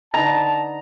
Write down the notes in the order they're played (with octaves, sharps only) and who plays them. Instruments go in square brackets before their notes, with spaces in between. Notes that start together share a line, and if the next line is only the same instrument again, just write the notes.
[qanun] D3 D#4 B4 [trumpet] A5 [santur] A#5